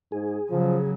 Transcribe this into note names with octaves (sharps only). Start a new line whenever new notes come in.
G#2 G#4
C#3 F3 F#3